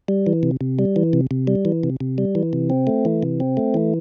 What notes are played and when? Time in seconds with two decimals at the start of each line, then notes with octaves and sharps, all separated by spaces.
0.08 G3
0.26 E3
0.43 C3
0.61 C3
0.79 G3
0.96 E3
1.13 C3
1.31 C3
1.47 G3
1.65 E3
1.83 C3
2.00 C3
2.18 G3
2.35 E3
2.53 C3
2.70 C4
2.87 A3
3.05 E3
3.23 C3
3.40 C4
3.57 A3
3.74 E3